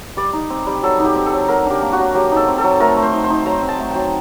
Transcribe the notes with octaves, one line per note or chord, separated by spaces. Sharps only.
G3 D5
D#4
C4
G3
F#3 A4
D#4
G4
C4
A4
F#3
F#3 A#4
D4 G4
A#3
F#4
F#3
F#3 G4
D#4 A4
C4
A4
F#3
A3 A#4
A3
C5
D#4
C5
D#4
F#3 A#5
C4
A5
A3
F#3 G5